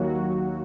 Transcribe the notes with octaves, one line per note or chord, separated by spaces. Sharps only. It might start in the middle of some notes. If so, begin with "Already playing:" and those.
Already playing: D#2 D#3 F#3 A#3 F#4